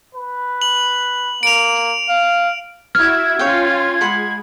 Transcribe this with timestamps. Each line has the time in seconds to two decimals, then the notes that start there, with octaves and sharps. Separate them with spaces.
0.15 B4
0.62 F#7
1.43 A#3 D7 F7
2.09 F5
2.95 E4 F#4 E5 F6 G#6
3.39 C#4 F4 C#5 F5 G5
4.01 G#3 F#5 B5 C6